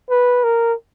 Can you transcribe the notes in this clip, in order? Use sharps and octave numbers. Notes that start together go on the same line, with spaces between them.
B4
A#4